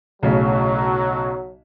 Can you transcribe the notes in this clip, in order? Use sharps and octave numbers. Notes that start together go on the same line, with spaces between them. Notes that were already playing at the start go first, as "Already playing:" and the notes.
B1 A2 C#3 F#3